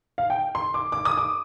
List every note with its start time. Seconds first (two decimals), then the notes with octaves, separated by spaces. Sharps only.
0.18 F5
0.30 G5
0.55 C6
0.74 D6
0.92 D6
1.05 D#6
1.17 D6